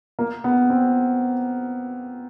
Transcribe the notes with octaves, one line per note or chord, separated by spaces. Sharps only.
A#3
B3
C4